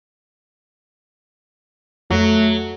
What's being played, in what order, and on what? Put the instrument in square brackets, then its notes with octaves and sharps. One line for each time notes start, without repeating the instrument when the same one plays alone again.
[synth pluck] F2 [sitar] F#3 [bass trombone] A3